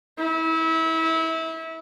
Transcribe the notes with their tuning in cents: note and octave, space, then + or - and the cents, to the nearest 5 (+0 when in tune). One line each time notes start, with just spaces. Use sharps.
E4 -25